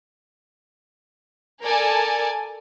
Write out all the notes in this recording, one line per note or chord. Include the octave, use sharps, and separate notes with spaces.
A4 A#4 D5 G#5 A5